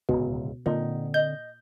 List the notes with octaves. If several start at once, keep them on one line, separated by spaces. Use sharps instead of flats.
D1 C#2 B2
A#2 D3 C4 D#4
D#5 G6